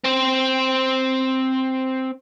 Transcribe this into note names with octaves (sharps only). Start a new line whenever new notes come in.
C4 C5